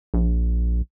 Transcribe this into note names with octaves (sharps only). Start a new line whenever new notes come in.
A#1